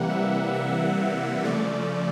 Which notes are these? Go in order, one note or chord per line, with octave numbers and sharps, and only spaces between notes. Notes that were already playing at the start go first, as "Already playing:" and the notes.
Already playing: C3 E3 G3 A#3 F#5
E5
E5
C#3 F3 A3 D5